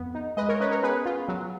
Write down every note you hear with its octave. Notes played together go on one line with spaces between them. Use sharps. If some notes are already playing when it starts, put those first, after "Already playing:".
Already playing: F2 B3
D#4
G#3 B4 D#5
A#4 C#5
C#4 B4 D#5
A#4 C#5
B3 G#4 B4
F4
F#3